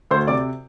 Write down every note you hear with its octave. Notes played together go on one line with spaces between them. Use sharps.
D2 C5 C6
C3 D5 D6